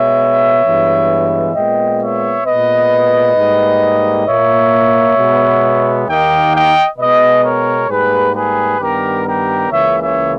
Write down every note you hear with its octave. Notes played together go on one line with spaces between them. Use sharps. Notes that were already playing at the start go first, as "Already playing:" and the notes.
Already playing: B2 G#3 B3 C#5 E5
G2 E3 G#3 B3
A#2 G#3 B3 D#5 G5
C#5 E5
A#2 G#3 B3 B4 D#5
G#2 G3 A#3
A#2 A#3 C#5 E5
B2 G#3 B3
D#2 D#3 A#3 D#5 G5
D#5 G5
B2 G#3 B3 B4 D#5
A#4 C#5
G#2 G3 A#3 G#4 B4
G#4 B4
G2 D#3 G3 B3 G4 A#4
G4 A#4
C#2 C#3 E3 A#3 C#5 E5
C#5 E5